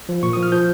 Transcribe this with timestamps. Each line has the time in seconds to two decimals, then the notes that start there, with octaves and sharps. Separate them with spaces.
0.09 F3
0.23 A#2 C#6
0.33 D#6
0.37 F3
0.43 F6
0.52 F3 G6